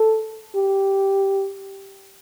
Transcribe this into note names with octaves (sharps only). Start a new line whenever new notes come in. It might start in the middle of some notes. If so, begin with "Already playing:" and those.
Already playing: A4
G4